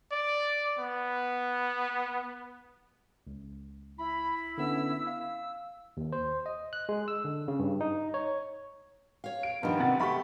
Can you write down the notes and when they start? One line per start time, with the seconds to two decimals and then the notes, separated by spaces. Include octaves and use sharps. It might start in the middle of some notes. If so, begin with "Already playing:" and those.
0.12 D5
0.79 B3
3.27 C#2
3.98 E4 B5
4.58 D3 B3 C#4 E6
5.07 F5
5.97 D#2
6.13 C5
6.46 D#5
6.73 F#6
6.89 G#3
7.08 E6
7.25 D3
7.48 C#3
7.59 G2
7.81 D#4
8.14 C#5
9.24 C#5 F5
9.43 D7
9.63 G2 D#3 F3 B3
9.80 C3 F#5 A6
10.00 A3 G4 E5 B5 C#6